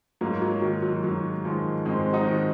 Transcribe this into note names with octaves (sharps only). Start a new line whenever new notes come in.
G#2 F#3 A#3
F#3
D#3 F#3
F#3
G#2 F#3
D#3 F3 G#3
G#2 G#3 C4
D#4 F#4
D#3